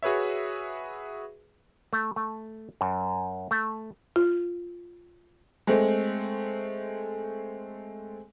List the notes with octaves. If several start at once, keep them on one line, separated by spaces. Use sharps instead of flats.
F#4 G#4 B4 C#5 E5
A3
A3
F#2
A3
F4
G#3 A3 C4